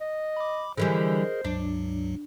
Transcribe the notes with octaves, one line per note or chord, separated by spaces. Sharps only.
D#5
B5 D6
D3 E3 G3 G#4 A#4 C5 D#5
C#2 G2 F#3 D4